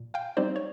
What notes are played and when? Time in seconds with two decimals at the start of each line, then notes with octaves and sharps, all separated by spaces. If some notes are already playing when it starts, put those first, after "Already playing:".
Already playing: A#2
0.14 F5 G5
0.37 G3 C4 D#4 C5 D5
0.56 C#5